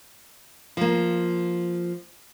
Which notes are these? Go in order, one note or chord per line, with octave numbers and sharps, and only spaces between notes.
F3 A#3